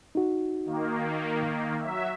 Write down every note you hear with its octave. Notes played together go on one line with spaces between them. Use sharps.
D#4 F#4
D#3 A#3
F#3 E5